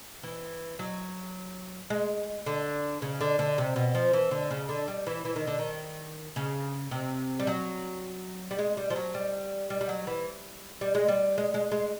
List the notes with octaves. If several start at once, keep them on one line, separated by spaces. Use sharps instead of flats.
E3
F#3
G#3
D3
C#3
D3
D3
C3
B2
F3
E3
D3
C#3
D3
G3
E3
E3
D#3
D3
D#3
C#3
C3
G3
F#3
G3
G#3
G3
F3
F#3
G3
G3
G3
F#3
E3
G3
G#3
G3
G#3
G#3
G#3